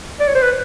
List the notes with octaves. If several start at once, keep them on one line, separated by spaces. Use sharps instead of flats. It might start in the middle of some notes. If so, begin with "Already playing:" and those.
D5
C#5
C5
B4